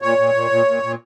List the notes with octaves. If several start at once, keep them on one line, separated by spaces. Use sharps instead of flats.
A#2 C#5
A#2
A#2
A#2
A#2
A#2